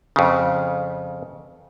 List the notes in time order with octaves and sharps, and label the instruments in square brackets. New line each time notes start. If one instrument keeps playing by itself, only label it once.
[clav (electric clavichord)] F2 C#3